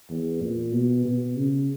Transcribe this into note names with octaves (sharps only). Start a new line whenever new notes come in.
E2
A#2
B2
B2
C#3